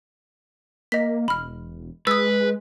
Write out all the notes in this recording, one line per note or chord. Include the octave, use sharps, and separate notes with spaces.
A#3 D#5 B6
E1 B5 F6
G#3 B4 D#6 E6